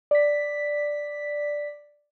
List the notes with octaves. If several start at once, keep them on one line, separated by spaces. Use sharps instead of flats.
D5 B6